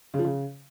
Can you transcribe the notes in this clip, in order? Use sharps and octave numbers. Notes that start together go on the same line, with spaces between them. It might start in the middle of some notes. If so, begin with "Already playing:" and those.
C#3
F3
C#3